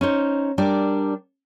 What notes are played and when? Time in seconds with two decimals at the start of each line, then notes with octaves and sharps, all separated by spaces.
0.01 C#4 D#4 C5
0.58 G3 D4 A#4 D5